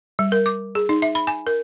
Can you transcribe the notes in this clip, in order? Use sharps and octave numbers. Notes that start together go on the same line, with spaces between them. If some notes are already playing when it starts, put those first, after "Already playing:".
G3
A#4
D6
G#4
D#4
E5
B5
G#5
A#4